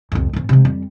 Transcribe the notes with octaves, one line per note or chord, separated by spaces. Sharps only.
C2 F2
D1 G#2
C3 G#3
F2 G3